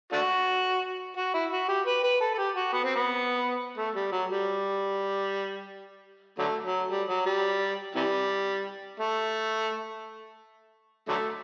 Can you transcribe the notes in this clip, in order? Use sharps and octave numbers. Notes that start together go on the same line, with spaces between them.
A3 D4 F#4
F#4
E4
F#4
G4
B4
B4
A4
A4
G4
F#4
B3
C4
B3
A3
G3
F#3
G3
D3 F#3 A3
F#3
G3
F#3
G3
C3 E3 G3
A3
D3 F#3 A3